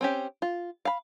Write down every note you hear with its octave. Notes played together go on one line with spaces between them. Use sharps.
C4 C#4 G4
F4
F5 B5